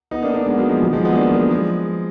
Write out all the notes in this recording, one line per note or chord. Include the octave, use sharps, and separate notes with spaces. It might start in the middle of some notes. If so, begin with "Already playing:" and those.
B3 D#4
A#3 D4
A#3 D4
G#3 B3
F#3 A#3
F3 G#3
D#3 F#3
F3 G#3
G#3 B3
A#3 D4
F#3 A#3
F3 G#3